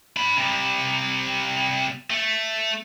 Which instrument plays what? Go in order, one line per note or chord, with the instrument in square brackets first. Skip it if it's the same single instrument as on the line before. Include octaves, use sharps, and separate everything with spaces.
[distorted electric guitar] D4 B5
C3 G3
A3